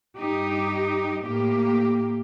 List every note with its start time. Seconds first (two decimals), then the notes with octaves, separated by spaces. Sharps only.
0.19 G2 D#4 G4
1.24 A2 A#3 G4